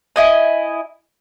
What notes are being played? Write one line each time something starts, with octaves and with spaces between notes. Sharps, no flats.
E4 D#5 G#5